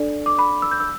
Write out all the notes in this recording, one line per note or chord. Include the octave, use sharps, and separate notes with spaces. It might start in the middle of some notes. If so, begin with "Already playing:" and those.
Already playing: D4 A4 D5
D6
B5
E6
G6
E6